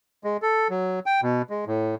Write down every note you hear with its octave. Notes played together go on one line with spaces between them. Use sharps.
G#3
A4
F#3
G5
B2
G#3
A2